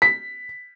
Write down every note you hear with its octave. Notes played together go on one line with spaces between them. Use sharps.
B6